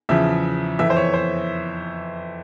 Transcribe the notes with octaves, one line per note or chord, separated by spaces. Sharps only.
E2 C#3 F3 E5
F2 E3 E5
C5
C#5
C5